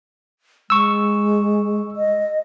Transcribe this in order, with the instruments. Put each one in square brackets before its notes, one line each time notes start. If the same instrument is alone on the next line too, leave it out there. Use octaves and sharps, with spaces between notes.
[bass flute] G#3 [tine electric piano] C#6 E6
[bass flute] D#5